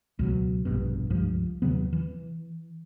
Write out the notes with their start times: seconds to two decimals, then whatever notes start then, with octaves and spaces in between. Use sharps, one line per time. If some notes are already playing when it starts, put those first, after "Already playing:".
0.19 C#2 B2 F#3
0.65 F1 A#1 G2 B2
1.10 C#2 G2 F3
1.62 D#2 C3 F#3 B3
1.93 E3